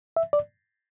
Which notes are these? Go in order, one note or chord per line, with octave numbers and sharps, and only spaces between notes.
E5
D5